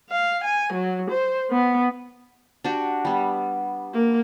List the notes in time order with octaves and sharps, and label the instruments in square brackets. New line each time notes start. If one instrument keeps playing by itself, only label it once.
[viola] F5
G#5
F#3
C5
B3
[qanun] D4 F#4 G4
G3 B3
[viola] A#3